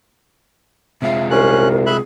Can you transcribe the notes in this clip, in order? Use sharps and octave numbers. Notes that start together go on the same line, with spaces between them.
C3 G#3 F4 E5
C2 C#4 A#4 F#6
G#4 E5 B5 F#6